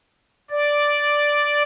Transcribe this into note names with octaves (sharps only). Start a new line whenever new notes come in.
D5